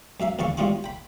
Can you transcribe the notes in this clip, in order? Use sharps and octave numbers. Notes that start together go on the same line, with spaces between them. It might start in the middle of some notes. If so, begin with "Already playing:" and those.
F#2 A#3 E5 F5
A#1 E2 D3 D5 F5 C#6
A2 G3 B3 F4 F#4 D6
G5 B5